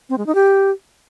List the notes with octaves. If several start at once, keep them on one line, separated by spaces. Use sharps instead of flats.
C4
G#3
D#4
G4